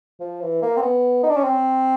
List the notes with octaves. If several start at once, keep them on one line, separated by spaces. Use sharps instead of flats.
F3
E3
A#3
C4
B3
D#4
D4
C#4
C4